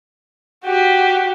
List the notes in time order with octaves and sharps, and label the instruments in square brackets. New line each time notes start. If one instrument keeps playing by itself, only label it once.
[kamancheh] F#4 G4